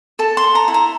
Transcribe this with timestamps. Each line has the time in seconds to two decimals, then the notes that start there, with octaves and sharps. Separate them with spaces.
0.19 A4 A5
0.37 C6
0.44 A4
0.55 A#5
0.68 E4
0.74 A#5